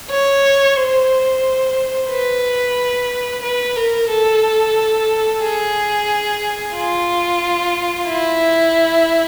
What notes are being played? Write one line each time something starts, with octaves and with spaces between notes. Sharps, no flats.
C#5
C5
B4
B4
A#4
A4
G#4
F4
E4